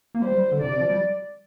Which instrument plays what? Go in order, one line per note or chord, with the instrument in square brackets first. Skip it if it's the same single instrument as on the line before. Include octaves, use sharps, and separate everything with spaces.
[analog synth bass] A#3
[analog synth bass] G3 [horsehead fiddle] C5
[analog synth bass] G3
D3
[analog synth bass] C3 [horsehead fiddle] D5
[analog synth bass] C3
F3
G3